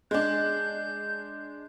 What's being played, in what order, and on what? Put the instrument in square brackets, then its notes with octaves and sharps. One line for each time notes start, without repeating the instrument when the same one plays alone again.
[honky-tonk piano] G#3 D4 [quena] G6